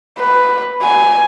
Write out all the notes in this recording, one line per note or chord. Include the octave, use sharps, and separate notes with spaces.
B4
G#5